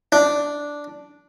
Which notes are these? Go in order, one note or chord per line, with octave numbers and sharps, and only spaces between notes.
D4